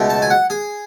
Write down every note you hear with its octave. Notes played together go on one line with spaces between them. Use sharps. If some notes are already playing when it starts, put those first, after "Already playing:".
Already playing: C#2 B2 A3
A5
G#5
F#5
G#4